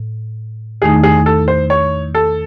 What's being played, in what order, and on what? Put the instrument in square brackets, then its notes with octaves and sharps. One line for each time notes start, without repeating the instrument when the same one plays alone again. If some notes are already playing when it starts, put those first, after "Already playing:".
Already playing: [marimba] A2
[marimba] E2 D#3 A3 D#4 [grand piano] G#4
[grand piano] G#4
A4
C5
C#5
A4